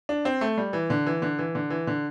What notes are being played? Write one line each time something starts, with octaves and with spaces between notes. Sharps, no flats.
D4
C4
A3
G3
E3
D3
E3
D3
E3
D3
E3
D3